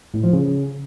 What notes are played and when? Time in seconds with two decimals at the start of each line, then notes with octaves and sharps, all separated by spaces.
0.14 A2
0.24 F3
0.33 C#3